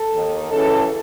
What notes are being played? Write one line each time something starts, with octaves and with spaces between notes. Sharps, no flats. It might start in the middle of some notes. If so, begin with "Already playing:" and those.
Already playing: A4
D#2 D#3
F#2 C#3 E3 A4